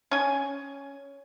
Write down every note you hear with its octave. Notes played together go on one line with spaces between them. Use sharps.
C#4 G#5